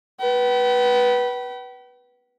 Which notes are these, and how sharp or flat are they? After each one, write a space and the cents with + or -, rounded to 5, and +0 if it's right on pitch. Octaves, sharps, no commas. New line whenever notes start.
B4 -15 G5 -45